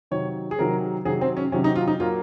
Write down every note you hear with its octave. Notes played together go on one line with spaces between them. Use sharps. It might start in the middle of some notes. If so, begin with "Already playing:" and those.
C3 D#3 F#3 C#5
G#4
C3 D#3 F#3 A#4
C3 D#3 F#3 G#4
C4
C#4
C3 D#3 F#3 C#4
D#4
F4
D#4
A#2 F#3 A#3 F4